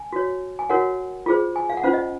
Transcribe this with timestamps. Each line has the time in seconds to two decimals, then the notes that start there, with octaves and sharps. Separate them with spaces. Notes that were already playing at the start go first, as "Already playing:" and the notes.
Already playing: G#5
0.13 F#4 C#5
0.59 G#5
0.70 F#4 A#4 C#5 F#5
1.26 F4 G#4 C5
1.56 G#5
1.70 F5
1.77 F#5
1.83 C#4 F4 C5 F5
1.93 D#5